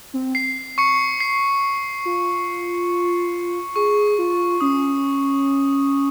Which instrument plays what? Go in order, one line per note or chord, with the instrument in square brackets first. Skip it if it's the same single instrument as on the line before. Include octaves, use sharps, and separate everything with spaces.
[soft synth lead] C4
[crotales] C7
C#6 C#7
C7
[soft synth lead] F4
[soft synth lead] G#4 [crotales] C#6
[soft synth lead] F4
[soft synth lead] C#4 [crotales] D#6